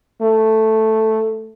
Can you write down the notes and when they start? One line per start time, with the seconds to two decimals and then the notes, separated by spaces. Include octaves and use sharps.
0.21 A3